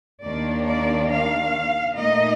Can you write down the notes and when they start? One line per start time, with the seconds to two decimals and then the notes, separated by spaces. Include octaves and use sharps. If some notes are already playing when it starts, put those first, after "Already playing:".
0.24 D#2 D#3 A#3 D4 D5
0.67 D5
1.10 F5
1.96 A#2 A3 D#4 D#5